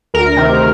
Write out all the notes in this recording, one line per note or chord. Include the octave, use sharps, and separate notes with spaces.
D2 A#4
C3 D#3